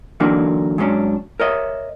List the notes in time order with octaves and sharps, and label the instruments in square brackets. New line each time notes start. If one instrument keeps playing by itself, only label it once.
[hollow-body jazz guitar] D3 E3 F#3 A#3 D4 D#4
G#2 F#3 G#3 C#4 D4
A#4 C#5 D#5 E5